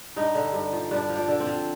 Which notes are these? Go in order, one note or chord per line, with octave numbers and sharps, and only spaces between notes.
G2 D#4
D3
G2
F3
G2 D4
F3
D4
D3
C4
F3